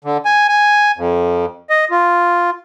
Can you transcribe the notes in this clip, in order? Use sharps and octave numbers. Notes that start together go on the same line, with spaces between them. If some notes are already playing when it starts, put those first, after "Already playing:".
D3
G#5
G#5
F2
D#5
F4